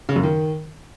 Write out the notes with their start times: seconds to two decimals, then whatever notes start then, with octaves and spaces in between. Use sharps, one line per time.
0.09 C#3
0.16 F#2
0.23 D#3